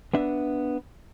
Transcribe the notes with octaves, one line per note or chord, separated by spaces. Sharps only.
B3 D4 E5